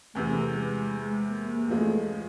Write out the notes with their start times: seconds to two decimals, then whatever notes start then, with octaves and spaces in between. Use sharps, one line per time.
0.15 E2 C3 E3 A3
0.54 G#3
0.91 G#3
1.30 A#3
1.67 E2 C#3 F3 G#3 A3